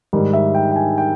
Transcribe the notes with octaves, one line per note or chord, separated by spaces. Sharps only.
G#2 D#3 G3
E5
G5
G5
G#5
G5